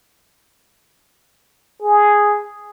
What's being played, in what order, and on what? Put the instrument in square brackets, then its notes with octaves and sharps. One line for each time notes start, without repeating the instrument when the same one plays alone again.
[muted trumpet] G#4